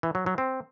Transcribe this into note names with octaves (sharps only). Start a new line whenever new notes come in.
E3
F#3
F#3
C4